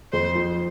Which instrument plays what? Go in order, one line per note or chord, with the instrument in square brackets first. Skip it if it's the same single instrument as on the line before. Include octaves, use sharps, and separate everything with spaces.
[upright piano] F2 [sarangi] C5
[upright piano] F3